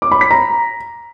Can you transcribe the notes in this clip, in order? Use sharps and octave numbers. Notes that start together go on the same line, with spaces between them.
D6
B5
B6
A#5